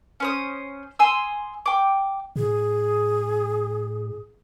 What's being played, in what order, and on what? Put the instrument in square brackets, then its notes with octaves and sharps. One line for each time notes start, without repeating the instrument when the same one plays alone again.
[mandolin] C#4 C5 D#6
G#5 C6 D#6 E6
G5 D6
[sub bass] A2 [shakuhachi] G#4